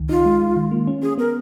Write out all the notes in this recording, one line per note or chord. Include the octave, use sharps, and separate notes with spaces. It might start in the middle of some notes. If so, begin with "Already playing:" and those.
Already playing: C#2 D#3
D#4 F4
G#3
G#3
D#3
A#3
C#4
C#4 G#4
B3 A#4